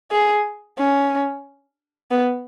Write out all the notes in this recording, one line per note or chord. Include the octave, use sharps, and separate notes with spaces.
G#4
C#4
B3